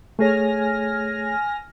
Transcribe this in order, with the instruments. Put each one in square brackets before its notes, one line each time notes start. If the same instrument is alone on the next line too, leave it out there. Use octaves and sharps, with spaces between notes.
[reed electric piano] A3 G#4 C#5 [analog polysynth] G#5 F6 A#6